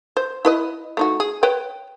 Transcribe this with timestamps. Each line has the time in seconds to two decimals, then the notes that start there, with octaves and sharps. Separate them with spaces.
0.17 C5
0.45 E4 B4 D#5
0.97 A3 D#4 F#4
1.20 G#4
1.43 B4 C#5 G5